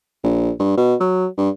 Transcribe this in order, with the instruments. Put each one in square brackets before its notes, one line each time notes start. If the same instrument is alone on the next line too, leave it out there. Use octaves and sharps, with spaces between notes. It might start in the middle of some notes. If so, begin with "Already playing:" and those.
[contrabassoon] A#1
G2
B2
F#3
G2